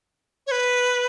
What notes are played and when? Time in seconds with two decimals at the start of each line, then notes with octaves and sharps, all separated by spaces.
0.47 C#5
0.51 B4